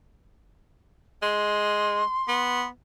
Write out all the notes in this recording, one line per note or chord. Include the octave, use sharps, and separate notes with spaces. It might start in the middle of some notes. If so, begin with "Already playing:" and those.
G#3 C6
B3